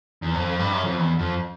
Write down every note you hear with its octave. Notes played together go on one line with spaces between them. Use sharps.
E2
F2
G2
F#2
F2
E2
F2